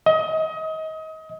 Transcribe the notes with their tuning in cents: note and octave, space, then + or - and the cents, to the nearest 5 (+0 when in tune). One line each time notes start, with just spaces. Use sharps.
D#5 +30